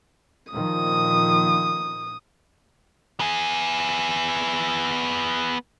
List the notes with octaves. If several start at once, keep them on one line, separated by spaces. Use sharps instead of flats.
A#2 D#3 F3 D#6
B3 G#4